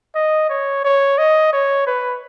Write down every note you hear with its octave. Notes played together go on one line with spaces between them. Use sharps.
D#5
C#5
C#5
D#5
C#5
B4